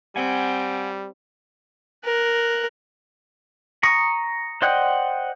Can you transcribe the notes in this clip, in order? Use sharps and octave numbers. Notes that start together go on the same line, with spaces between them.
G3 C4 F#5 G#5
A#4 F#6
A#5 C#6 D#6
C5 D5 D#5 F#5 G5